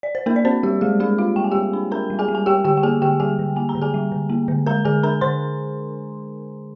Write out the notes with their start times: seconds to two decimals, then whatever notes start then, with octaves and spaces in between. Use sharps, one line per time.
0.03 D5
0.15 C5
0.26 A#3 D4 A#4
0.36 D5
0.45 C4 D4 C5
0.63 G3 G4
0.81 G3 G#3 G#4
1.00 G#3 D4 G#4
1.18 D4 F4 F5
1.36 G3 G5
1.44 G#5
1.52 G3 G4 G5
1.73 D4
1.91 D4 A#4 A#5
2.10 G3
2.19 G#4 G#5
2.28 G3
2.35 G#5
2.46 G3 G4 G5
2.64 D3 G4 G5
2.77 G5
2.83 A#3 G#4 G#5
3.02 D3 G4 G5
3.20 G3 G#4 G#5
3.39 D3
3.56 A#3 G#5
3.69 A#5
3.75 D3
3.82 G#4 G#5
3.94 G3
4.12 D3
4.30 A#3
4.48 D3
4.67 G#3 A#4 A#5
4.85 D3 G#4 G#5
5.03 D4 A#4 A#5
5.21 D3 C5 C6